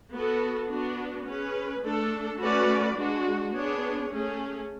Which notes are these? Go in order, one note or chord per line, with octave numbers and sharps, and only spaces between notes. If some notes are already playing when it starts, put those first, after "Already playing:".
B3 F#4 A4
B3 D4 F#4
C#4 G#4 B4
A3 D4 A4
A3 C#4 F#4 B4 D5
G#3 D4 F#4
B3 D4 G#4 C#5
A3 C#4 G#4